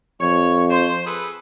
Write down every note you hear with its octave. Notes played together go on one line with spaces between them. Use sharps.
F2 C#5
C5
G#4 A4 B4